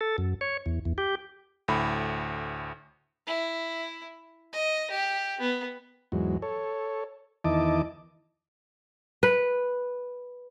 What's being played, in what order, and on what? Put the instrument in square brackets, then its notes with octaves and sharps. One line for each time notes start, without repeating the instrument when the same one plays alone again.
[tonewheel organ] A4
F#2
C#5
E2
E2
G4
[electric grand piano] D2 A2 B5
[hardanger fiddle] E4
D#5
G4
B3
[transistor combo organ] E2 G#2 F#3
A4 C#5
E2 D#3 E4 D#5 A5 D6
[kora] B4